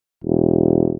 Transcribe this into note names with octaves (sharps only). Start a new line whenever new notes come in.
E1